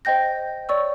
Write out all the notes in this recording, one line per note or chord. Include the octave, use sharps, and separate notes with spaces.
C5 D#5 G5 G6 A#6
C#5 D5 C#6 E6